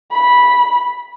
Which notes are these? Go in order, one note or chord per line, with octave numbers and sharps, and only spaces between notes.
B5